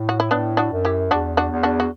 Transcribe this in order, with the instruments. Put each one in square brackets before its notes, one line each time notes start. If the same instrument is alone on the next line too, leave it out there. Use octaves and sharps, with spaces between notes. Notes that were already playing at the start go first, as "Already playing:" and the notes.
Already playing: [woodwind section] A2
[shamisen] F#4
E4
[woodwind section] A2 [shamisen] B3 D4
[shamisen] D4 F#4
[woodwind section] F#2
[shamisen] E4 G4
[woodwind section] E2 [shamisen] D4 F#4
[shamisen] D4 F#4
[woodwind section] E2
[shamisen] D4 F#4
F#4